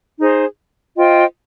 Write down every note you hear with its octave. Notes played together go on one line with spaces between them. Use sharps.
D#4 G#4 C5
F4 C5 D#5 G5